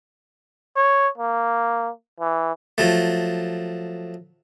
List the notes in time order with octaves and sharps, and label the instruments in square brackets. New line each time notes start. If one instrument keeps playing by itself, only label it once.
[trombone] C#5
A#3
E3
[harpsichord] F3 F#3 A3